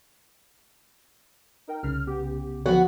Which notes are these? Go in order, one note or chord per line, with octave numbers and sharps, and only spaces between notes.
D#4 A#4 G5
C2 C#3 F6
B3 G4
D3 F3 F#3 B3 F#4 F#5